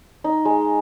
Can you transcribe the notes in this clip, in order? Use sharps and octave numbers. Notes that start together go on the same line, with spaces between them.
D#4
G#3